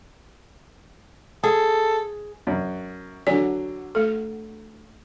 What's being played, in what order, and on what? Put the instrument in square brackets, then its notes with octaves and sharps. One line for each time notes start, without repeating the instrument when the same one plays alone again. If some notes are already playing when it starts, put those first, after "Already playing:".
[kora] G#4 [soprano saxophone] A4
[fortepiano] F#2
[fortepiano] D3 F#3 [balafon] D5 G#5
[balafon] A3 A4